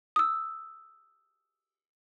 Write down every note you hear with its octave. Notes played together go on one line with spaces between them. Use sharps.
D#6 E6